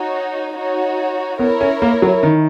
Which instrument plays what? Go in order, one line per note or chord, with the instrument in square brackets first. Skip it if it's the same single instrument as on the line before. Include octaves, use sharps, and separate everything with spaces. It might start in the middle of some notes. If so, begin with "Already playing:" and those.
Already playing: [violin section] D#4 F#4 C#5
D#4 F#4 C#5
[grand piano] B3 [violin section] E4 A#4 C#5
[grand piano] C#4
A#3
F#3
D#3